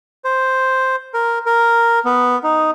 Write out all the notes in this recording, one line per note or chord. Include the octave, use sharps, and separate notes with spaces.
C5
A#4
A#4
B3
D#4